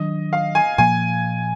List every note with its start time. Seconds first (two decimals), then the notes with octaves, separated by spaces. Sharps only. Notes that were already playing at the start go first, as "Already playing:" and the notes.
Already playing: D#3 F#3 D4 D#5
0.33 F5
0.55 G#5
0.78 A#2 F3 A#3 G#5